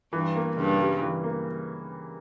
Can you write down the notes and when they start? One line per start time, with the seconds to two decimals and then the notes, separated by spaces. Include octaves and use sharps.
0.13 G2 E3
0.36 A#3
0.57 G2 C#3
0.80 G3
1.02 E3
1.23 A#3